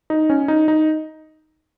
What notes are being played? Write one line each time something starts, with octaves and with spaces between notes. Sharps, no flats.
D#4
C#4
D#4
D#4